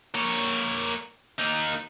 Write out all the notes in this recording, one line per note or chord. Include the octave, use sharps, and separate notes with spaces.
A#3 C#5
A#3 D#4